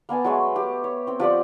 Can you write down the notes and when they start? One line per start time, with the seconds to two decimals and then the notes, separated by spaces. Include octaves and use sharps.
0.09 A#3 B3 G#5 A5
0.24 F#3 G#3 A3
0.56 G4
0.84 C#5
1.07 C4 G5
1.20 F3 G4 D5 F#5